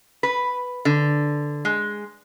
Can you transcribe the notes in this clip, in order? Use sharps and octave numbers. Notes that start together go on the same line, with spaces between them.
B4
D3
G#3